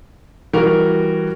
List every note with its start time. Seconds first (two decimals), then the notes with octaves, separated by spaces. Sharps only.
0.53 E3 G3 F#4 A#4